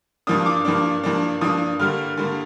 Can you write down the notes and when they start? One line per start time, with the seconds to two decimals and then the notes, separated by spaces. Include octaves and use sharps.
0.27 G2 F3 A#3 D4 D#6
0.46 D6
0.65 G2 F3 A#3 D4
1.03 G2 F3 A#3 D4
1.41 G2 F3 A#3 D4 D#6
1.79 G2 D3 G3 A#3 F6
2.17 G2 D3 G3 A#3